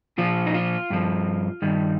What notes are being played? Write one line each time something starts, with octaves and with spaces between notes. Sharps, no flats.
A#2 F3 F4
D#4
F4
G2 F3
G2 D#3 G3